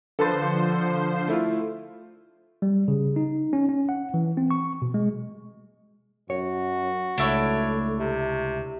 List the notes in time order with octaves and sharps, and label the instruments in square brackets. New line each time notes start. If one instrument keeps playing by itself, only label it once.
[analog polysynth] D3 F3 C5 [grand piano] A4 B4 A6
[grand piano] A3 E4 F4
[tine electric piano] G3
C#3
D#4
C#4
C#4
F#5
E3
C4
C#6
B2
G#3
[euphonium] F#2 [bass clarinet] F#4 [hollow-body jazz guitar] C#5
[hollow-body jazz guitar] C#2 [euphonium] A3 [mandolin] D4 E4 C#5
[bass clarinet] C3